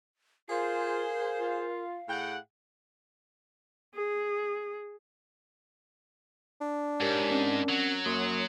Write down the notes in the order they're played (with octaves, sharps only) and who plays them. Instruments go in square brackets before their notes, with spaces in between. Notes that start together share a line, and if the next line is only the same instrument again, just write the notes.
[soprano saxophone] F4 [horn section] G#4 C5 [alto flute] A#4 [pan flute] F5
[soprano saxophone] F4
[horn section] A2 G#4 F#5 [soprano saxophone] G5
[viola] G#4
[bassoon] D4
[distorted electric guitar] G#2 [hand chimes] G4 A#4 C#5
[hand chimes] C4 C#4 A#4
[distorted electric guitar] F#3
[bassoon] F#2 [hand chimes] A#3 C6 D#6